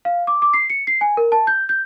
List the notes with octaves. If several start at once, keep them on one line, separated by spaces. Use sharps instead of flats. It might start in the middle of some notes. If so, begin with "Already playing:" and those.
F5
D6
D6
C7
C#7
C7
G#5
A#4
A5
G6
G6